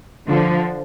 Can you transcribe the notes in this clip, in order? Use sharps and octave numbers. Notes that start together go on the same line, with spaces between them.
D3 F3